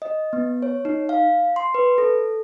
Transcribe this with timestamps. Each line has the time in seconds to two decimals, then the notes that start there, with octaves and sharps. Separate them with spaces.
0.02 D#5
0.33 B3
0.62 C#5
0.85 D#4
1.09 F5
1.56 C6
1.74 B4
1.98 A4